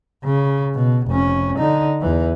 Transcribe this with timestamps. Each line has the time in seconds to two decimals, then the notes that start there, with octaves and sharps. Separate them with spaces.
0.25 C#3
0.75 B2
1.08 F1 C#4
1.58 D3 D#4
2.01 E2 E3